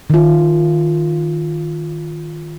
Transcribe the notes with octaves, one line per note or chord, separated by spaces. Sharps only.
D#3 F4